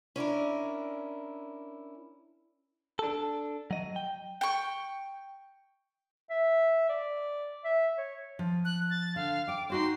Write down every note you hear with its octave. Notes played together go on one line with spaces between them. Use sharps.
C#4 D4 E4 A#4
D4 A4
F#3 D#5
G5
G5 C#6
E5
D5
E5
C#5
F3
F#6
A6
D3 F5
F5 G5 D6
D#4 F#4 C5 C6